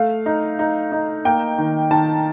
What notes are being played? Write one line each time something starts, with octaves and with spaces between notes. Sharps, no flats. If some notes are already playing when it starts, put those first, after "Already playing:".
Already playing: A3 F5
D#4
D#4
D#4
A#3 G5
D#3
D#3 A5